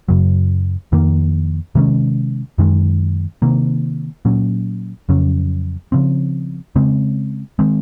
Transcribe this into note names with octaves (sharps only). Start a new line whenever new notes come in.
F#2 C#3 F#3
F2 D#3 A#3
C3 D#3 G#3 C#4
F#2 D#3 G#3
C3 D#3 A#3
A#2 F#3 C#4
F2 C#3 F#3 C#4
C#3 F3 C4
C#3 G#3 C4
D#3 G#3 C4